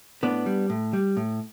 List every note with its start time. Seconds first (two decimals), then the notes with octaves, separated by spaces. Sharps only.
0.23 A2 B3 D4
0.46 G3
0.70 A2
0.93 G3
1.17 A2